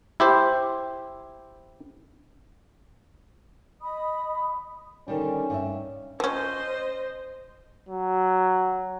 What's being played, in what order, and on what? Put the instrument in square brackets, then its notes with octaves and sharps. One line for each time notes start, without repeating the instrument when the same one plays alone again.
[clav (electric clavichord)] E4 G4 C5
[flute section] D#5 B5 D#6
[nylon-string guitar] D3 D#3 G3 [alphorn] C#4
[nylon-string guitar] G2 E5
[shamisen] F3 C#4 [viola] C5 D#5
[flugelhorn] F#3